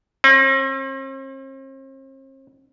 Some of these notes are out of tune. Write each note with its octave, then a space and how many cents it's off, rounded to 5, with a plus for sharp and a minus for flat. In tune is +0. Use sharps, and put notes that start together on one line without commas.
C4 +45